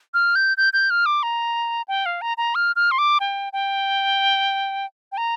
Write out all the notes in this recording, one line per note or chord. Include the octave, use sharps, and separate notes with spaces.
F6
G6
G6
G6
F6
D6
A#5
G5
F5
A#5
A#5
F6
F6
C6
D6
G5
G5
G5
A#5